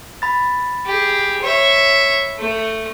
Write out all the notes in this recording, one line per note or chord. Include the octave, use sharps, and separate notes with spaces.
B5 A6
G4 G#4
C#5 E5
A3